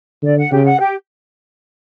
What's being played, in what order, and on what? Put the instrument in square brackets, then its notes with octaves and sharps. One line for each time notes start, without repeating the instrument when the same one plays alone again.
[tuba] D3 [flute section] D5
[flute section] F#5
[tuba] C#3 [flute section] G4
[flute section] F#5
G4